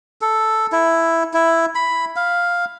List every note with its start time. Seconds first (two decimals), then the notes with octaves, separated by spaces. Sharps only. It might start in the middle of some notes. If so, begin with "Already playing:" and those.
0.21 A4
0.72 E4
1.34 E4
1.75 B5
2.16 F5